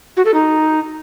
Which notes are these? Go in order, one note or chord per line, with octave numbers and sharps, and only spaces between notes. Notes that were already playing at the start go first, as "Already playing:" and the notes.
F#4
A4
D#4